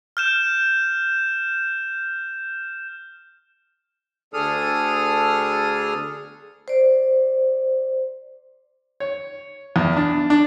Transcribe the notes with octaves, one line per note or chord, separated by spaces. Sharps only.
F6 G6 E7
D2 D4 G#4 A4 D#6 F6
C5 D5
C#5
E2
D4
D4